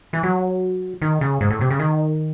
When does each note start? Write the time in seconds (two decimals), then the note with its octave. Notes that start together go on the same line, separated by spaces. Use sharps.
0.13 E3
0.23 F#3
1.02 D#3
1.21 C#3
1.41 G#2
1.50 A2
1.61 C3
1.71 C#3
1.79 D#3